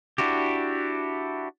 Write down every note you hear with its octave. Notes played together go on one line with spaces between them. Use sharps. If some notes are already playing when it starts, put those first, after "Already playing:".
D4 E4 F#4 G4